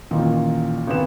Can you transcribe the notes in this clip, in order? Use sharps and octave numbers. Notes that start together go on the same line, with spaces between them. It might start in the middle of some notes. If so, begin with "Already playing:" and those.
A1 A#2 D#3
G#1 B3 E7